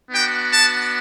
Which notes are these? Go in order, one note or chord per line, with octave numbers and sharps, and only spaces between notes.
B3 D4 F#4 G5
A5